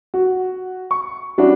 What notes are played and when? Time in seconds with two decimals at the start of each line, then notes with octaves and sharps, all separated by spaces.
0.14 F#4
0.91 C#6
1.38 G3 C#4 D4 E4 F#4